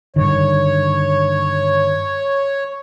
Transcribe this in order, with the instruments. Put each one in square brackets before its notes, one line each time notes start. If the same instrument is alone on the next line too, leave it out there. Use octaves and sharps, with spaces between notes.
[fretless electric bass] G2 D3 D#3 [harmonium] C#5